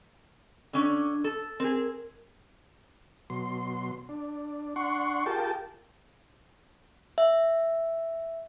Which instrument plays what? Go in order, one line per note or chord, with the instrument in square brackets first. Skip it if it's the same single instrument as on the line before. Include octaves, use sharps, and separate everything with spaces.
[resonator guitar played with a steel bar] D3 C#4 D5 [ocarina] D4
[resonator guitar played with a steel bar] A4
[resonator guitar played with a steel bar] C4 G#4 [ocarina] A#4
[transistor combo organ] B2 F#3 C6
D4
D4 F#5 C6 C#6
F4 G4 G#4 A#4 G5 A5
[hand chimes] E5